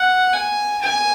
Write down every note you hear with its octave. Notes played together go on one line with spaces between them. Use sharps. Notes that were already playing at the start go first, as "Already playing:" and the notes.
Already playing: F#5
G#5
G#5